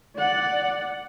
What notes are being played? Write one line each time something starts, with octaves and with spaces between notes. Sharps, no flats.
D5 F#5